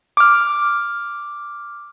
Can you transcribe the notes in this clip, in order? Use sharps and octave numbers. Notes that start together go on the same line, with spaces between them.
D6 F6